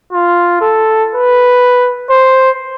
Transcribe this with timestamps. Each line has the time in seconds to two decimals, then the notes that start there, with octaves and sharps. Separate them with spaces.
0.12 F4
0.61 A4
1.15 B4
2.10 C5